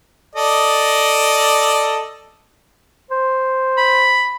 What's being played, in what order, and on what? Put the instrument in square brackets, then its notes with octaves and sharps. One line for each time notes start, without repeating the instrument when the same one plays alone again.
[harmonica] A4 D5 D#5
[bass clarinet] C5
[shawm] B5